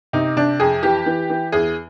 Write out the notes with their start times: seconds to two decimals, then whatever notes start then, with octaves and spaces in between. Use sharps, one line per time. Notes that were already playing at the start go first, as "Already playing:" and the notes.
0.13 C3 D#4
0.36 C3 D4
0.60 F2 G#4
0.83 E3 G4
1.06 E3
1.30 E3
1.52 E2 G#4